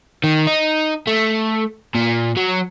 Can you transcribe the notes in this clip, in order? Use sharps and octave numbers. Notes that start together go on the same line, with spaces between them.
D#3
D#4
A3
A#2
F#3